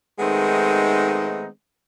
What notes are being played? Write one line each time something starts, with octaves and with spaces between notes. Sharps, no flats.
D#3 G#3 A3 B3 C4 D#4